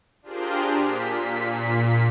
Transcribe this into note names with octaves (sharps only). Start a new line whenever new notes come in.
D4 F4 G4 G#4 A#4 C5
A#2 B6